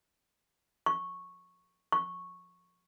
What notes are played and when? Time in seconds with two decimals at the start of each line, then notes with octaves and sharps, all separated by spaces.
0.86 C#6
1.92 C#6